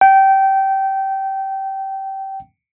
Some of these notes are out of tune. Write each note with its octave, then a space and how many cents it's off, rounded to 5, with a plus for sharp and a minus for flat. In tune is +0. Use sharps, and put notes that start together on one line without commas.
G5 -20